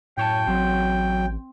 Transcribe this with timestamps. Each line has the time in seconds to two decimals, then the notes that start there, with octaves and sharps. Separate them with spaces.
0.17 F#2 A2 C#5 G5 A5
0.47 A1 F#3 C4